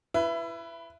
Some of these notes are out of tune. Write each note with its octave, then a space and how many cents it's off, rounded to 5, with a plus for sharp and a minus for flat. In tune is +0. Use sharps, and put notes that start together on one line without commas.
E4 +25 B4 +0